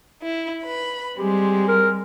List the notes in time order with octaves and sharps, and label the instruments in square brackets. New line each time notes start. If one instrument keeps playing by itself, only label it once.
[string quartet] E4
B4 B5
[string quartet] G3 G#3 C4 [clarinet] G4
[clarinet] A#4